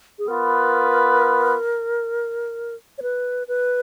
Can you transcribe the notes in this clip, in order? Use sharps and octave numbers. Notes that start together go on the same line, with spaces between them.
G#4
B3 F4 A#4 B4
C#5
B4
B4